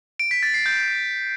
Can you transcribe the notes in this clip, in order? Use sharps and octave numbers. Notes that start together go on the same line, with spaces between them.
D7
B6
A6
C7
G6